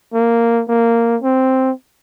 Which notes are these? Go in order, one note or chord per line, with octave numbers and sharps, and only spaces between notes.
A#3
A#3
C4